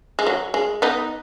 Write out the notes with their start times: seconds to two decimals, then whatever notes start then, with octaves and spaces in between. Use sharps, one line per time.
0.19 G#3
0.27 F#3
0.54 G#3
0.82 B3 D#4